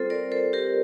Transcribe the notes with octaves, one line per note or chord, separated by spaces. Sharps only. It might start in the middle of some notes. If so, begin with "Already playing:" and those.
Already playing: G3 C4 F4 A4 C5
A#4 D5
A4 C5
G4 A#4